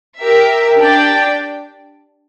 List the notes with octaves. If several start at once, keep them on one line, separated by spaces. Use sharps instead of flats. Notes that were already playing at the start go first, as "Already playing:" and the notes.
G4 A#4 E5
D4 G4 D5 G5